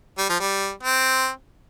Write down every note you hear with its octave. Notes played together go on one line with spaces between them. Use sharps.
G3
F3
G3
C4